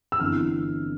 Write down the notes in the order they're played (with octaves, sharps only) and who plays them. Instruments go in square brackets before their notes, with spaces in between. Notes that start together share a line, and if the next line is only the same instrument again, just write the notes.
[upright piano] E6
G1 F2 E3 F6